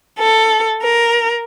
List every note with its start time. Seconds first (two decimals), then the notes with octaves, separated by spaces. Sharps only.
0.18 A4
0.82 A#4